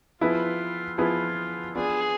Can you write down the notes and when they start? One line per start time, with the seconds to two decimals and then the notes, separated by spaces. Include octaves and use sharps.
0.21 F3 B3 E4 F4 G#4 B4
0.98 F3 B3 E4 F4 G#4 B4
1.75 B3 D4 F4 G#4 B4 D5